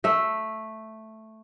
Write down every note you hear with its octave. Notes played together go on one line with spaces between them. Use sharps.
A3 E5